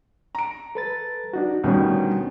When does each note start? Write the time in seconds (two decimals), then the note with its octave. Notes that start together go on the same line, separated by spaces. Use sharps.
0.35 A#5 D7
0.75 A4 B4 A6
1.33 D4 D#4 F#4
1.64 D2 B2 D#3 G3 B3 C#4